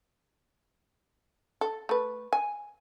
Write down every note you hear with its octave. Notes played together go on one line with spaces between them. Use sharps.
A4
A3 B4
G#5